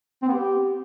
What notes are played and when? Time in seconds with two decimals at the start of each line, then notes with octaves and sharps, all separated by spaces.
0.22 C4
0.28 B3
0.33 G4